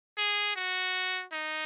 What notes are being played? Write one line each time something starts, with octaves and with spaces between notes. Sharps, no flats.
G#4
F#4
D#4